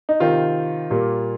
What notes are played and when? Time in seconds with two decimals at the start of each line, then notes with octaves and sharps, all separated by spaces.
0.09 D#4
0.20 C3 D#3 C4 F4
0.90 A#2 G3 A#3